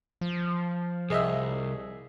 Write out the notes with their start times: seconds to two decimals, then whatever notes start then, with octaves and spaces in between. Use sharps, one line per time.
0.21 F3
1.10 C2 G#4 D#5 E5